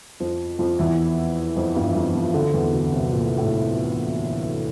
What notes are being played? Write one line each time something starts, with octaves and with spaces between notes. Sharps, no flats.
F2 F3
F2 F3
E2 E3
F2 F3
G2 G3
E3
F2 F3
F2 F3
D2 D3
E2 E3
D2 D3
C2 C3
A#2
A2